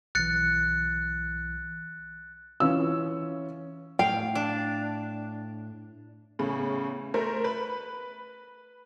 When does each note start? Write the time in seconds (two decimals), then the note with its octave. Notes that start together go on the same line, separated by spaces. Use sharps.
0.15 B1 E3 F#6 A6 C#7
2.60 E3 C#4 F4 E6
3.99 A2 F5 G5
4.35 D4
6.39 E2 A2 C#3
7.14 A3 A#4 C5
7.44 B4 B5